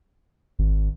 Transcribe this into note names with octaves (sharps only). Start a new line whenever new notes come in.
G#1